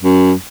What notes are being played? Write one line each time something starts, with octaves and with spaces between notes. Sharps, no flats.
F#2